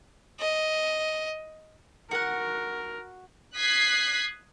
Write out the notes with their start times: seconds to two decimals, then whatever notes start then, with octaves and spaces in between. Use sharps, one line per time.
0.40 D#5
2.11 F#4 A#4 F#5
3.57 D#6 F#6 G#6 B6 C7